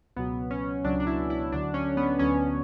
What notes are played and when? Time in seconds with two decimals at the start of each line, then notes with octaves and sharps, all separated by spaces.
0.16 C#2 B2 F#3 B3
0.51 C#4
0.84 C#2 B2 F#3 D4
1.00 D4
1.07 E4
1.30 E4
1.52 D2 D3 F#3 D4
1.74 C#4
1.97 B3
2.19 D2 D3 F#3 C#4